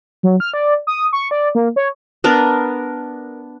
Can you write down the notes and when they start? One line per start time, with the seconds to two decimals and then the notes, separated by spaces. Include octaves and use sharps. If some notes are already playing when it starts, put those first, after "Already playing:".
0.23 F#3
0.40 F6
0.54 D5
0.87 D#6
1.13 C#6
1.31 D5
1.55 A#3
1.76 C#5
2.24 B3 D4 A#4